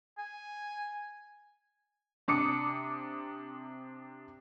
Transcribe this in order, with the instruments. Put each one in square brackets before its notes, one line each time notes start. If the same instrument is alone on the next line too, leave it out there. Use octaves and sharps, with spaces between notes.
[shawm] G#5
[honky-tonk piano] C3 D4 D6 D#6 C#7